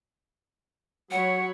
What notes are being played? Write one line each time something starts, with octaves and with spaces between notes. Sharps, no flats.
F#3 C#5 F#5 B5